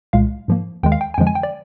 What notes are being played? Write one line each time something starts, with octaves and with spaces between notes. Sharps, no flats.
C2 A#2 G#3 F5
G#2 F3 A#3
D#2 D#3 G#3 G5
F5
G5
G#5
F2 D3 F3 G#3 G5
G#5
G5
D5